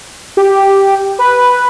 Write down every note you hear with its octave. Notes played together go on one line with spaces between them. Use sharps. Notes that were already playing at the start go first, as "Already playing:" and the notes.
G4
B4